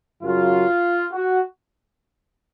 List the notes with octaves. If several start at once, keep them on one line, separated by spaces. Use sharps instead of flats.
F#2 C#3 F#3 F4
F#4